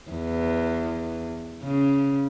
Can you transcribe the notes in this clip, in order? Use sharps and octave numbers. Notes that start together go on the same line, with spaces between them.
E2
C#3